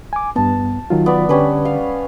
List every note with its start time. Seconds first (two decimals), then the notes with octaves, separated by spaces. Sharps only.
0.13 G#5 D6
0.36 G2 B3 A5
0.90 D#3 F#3 F4
1.06 B3 D5
1.29 D3 G3 C#4 B4
1.65 F5